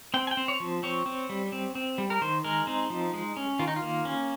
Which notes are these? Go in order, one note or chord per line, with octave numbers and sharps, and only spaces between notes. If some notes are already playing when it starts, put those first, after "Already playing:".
C4 G5
G#5
G5
C4
C#5
F3
C4 C#5
C4
G3
C4
C4
G3
A#4
D#3 C5
G#3 A#4
C4 D#4
F3
G#3
C#4
D#3 F4
D#4
F4
A#3
C#4